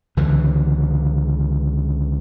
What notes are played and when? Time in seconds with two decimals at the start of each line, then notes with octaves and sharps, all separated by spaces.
0.17 C#2 D3 E3